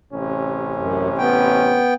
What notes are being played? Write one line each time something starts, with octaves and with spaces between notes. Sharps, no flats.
A1 C3 C#4
F#2
B3 G5